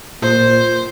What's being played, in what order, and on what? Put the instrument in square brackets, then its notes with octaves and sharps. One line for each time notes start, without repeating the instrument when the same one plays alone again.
[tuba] A#2 [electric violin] C5